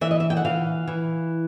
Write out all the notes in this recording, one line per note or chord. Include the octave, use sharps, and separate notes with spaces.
E3 E5
D#5
E5
G5
F#5
E3 F5
E3